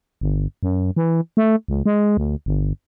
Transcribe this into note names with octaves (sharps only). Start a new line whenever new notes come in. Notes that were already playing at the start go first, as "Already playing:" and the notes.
G1
F#2
E3
A3
C#2
G#3
D2
G1